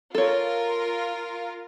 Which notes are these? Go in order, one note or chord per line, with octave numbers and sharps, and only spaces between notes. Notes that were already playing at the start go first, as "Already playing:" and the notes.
F4 A4 A#4 C#5